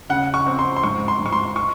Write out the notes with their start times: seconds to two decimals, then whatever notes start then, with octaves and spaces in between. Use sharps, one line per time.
0.10 C#3 F#5
0.34 C#6
0.46 C4
0.59 C6
0.76 C6
0.83 G#2 C#6
1.08 C6
1.20 G#2
1.26 C#6
1.32 C6
1.56 C#6